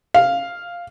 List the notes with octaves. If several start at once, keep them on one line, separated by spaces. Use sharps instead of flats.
F5